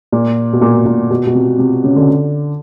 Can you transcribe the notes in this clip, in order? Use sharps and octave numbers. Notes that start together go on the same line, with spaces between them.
A#2
B2
A#2
A#2
B2
B2
C3
C3
C#3
D3